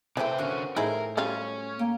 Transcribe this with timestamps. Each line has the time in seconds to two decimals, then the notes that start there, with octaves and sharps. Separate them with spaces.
0.17 C3 E3 A3 C4 B4 G5
0.38 D3 A#3 C#4 F#4
0.76 A2 D#4 E4 G#4 A#4 C5 G5
1.17 F#3 G3 C#4 F4
1.79 A#3 G5